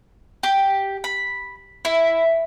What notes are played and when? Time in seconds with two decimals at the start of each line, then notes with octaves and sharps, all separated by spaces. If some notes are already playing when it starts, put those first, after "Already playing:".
0.43 G4
1.04 B5
1.85 E4